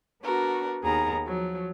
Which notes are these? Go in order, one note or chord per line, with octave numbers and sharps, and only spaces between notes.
B3 D4 F#4 A#4 B4
D#2 B3 D#4 G#4 A#4 A#5
F3 F#3